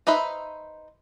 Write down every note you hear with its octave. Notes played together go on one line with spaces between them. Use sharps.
D#4 B4 C5 E5